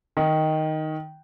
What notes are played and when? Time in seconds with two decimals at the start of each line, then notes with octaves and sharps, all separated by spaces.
0.17 D#3